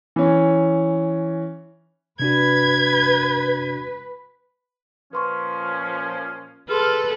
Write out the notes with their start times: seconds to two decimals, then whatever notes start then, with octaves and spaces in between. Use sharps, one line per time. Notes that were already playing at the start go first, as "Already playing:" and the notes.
0.16 E3 C#4
2.20 C3 D4 F#4 B4 G#6
5.13 A#2 F3 C#4 B4 C6 C#6
6.69 G#4 A4 B4 C6 F6